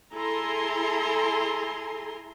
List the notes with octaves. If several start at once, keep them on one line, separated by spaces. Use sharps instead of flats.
E4 G#4 A4 G#5 A#5 C6